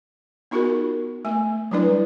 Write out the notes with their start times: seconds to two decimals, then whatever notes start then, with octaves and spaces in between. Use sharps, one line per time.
0.51 B3 D#4 F4 F#4 G#4 A#4
1.25 A3 G#5
1.71 F#3 G3 D4 E4 B4 D5